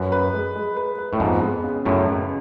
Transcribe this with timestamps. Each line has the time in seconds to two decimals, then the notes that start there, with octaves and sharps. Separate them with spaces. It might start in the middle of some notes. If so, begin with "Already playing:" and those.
Already playing: F#2 B4
0.12 B4
0.33 G#3
0.56 G#3
0.77 B4
0.98 B4
1.13 A2
1.20 F2 G#2 B3
1.42 G#3
1.64 C#3
1.85 C#2 F#2 A2
2.08 C#3